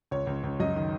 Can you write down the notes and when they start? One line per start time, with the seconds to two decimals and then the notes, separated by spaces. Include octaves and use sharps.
0.11 C#2 C#5
0.27 C#2
0.44 C#2
0.60 F#2 D#5
0.76 D#3